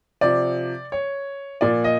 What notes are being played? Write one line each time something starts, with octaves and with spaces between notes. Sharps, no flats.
C3 F3 D5
C#5
A#2 F3 D5
D#5